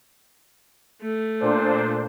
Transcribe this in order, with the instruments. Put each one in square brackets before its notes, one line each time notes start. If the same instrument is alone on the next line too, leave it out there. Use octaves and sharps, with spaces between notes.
[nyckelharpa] A3
[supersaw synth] A#2 D4 C5